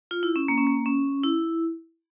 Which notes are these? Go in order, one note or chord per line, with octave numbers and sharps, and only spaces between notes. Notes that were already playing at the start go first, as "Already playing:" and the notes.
F4
E4
C#4
A#3
C#4
A#3
C#4
E4